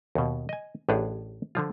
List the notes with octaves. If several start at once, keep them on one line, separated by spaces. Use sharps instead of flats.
D#2 B2
D#5 G#5
A1 A2 D4 G4 G#4 F#5
D3 F3 F4